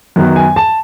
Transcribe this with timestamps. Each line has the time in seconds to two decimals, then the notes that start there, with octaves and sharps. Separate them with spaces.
0.16 F#2 D#3 F#3 B3
0.36 G#5
0.56 A5